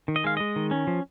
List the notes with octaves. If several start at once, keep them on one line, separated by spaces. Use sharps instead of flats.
D#3
D#5
G#3 F5
G#3 D#5
D#3
C#4
F3